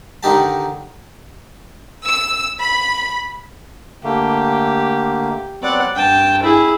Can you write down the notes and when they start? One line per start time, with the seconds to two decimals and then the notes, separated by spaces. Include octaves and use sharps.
0.23 D3 D#3 D#4 G4 A5
2.07 E6
2.58 B5
4.04 D3 A3 A#3 G4
5.62 F#3 B3 C4 D5 F#5
5.95 G2 G5 A5
6.43 E4 G#4